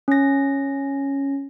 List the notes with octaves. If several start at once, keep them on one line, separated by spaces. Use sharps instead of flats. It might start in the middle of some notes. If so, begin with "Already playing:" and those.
C#4 A#6